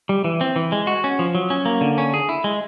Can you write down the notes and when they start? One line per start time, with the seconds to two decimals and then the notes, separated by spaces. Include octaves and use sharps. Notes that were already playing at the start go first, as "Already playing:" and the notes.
0.09 G3
0.24 E3
0.41 C4
0.56 E3
0.72 G#3
0.87 F#4
1.04 C#4
1.19 F3
1.35 F#3
1.50 C#4
1.65 A#3
1.81 D3
1.98 C#4
2.14 G#4
2.29 E4
2.44 G#3